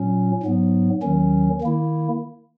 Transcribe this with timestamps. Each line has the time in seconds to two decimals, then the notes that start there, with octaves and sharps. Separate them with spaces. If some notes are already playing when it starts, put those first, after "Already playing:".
Already playing: A#2 F#3 C#4
0.43 G#2 F#3 B3
1.02 D#2 D#3 F#3 C#4
1.61 D#3 A#3 E4